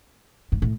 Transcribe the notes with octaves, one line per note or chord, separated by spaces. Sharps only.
G#2
A2